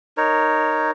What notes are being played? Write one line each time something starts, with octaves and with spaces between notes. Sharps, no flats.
D#4 A#4 C#5